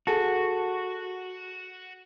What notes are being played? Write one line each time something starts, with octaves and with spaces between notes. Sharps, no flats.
F#4 G#4 A4 A5